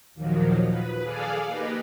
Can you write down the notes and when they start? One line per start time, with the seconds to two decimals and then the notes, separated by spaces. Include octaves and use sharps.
0.14 D#2 A#2 D#3 F3 F#3
0.65 B4
1.02 G#4 A4 D5 F5 G#5
1.46 A#3 D#4 G4 B4